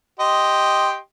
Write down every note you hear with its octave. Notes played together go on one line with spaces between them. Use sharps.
G4 D#5 C6